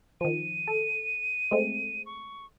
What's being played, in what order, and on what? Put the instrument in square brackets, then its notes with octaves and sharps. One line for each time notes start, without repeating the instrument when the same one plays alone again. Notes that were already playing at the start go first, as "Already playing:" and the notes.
[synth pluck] D#3 F3 [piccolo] D#7
[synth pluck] A4
G#3 A3 C4
[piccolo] C#6